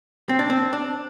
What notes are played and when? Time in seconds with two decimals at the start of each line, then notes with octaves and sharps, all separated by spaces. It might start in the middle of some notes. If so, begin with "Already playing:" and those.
0.29 C4
0.39 D4
0.50 C4
0.73 D4